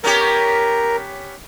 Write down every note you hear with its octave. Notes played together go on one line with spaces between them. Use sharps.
B3 C#4 G4 A#4